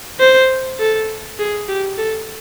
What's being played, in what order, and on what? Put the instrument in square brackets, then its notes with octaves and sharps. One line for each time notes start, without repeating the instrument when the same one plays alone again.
[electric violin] C5
A4
G#4
G4
A4